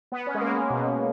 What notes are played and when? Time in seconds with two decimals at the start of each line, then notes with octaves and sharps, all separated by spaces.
0.12 B3
0.27 C#4
0.35 G#3
0.41 A#3
0.70 B2